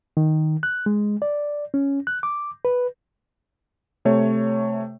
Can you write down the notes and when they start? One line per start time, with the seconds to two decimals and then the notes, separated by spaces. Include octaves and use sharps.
0.17 D#3
0.63 F#6
0.86 G#3
1.22 D5
1.74 C#4
2.07 F#6
2.23 D6
2.65 B4
4.05 C3 A3 C#5